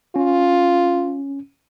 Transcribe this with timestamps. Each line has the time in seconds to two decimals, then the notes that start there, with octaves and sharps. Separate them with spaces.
0.16 C#4 F4